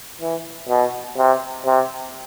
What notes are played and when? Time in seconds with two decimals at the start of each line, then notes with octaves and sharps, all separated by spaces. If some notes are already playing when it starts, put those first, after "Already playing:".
0.21 E3
0.69 B2
1.17 C3
1.66 C3